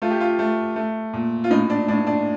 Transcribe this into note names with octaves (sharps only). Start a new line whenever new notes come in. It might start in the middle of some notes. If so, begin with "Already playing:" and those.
A3 F4
G4
F4
A3
A3
A#2
F4
A2 D#4
D4
A2 D4
D4